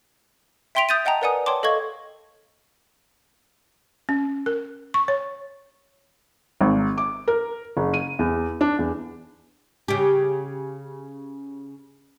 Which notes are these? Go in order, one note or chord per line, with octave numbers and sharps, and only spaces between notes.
E5 G5 C6 B6 D7 F7
D#6 G6 A6 D#7
D#5 F#5 G5 A5 A#5 D#6
A#4 B4 D5 F#5 G#5 D#6
C#5 G5 A5 C6 D6
A4 D#5 F5 C#6 G#6
C#4
A#4
C#6
C#5
G#1
D6
A#4
F#1
D#7
E2
D4
E2
C#3 G4